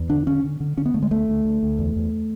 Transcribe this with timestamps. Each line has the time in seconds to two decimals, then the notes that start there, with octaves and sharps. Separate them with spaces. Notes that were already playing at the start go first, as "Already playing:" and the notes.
Already playing: E2
0.09 D3 D4
0.27 D3 C#4
0.44 D3
0.60 D3
0.77 D3 C#4
0.86 B3
0.94 D3 A3
1.03 G#3
1.11 D2 A3
1.28 D2
1.45 D2
1.63 D2
1.79 E2
1.96 E2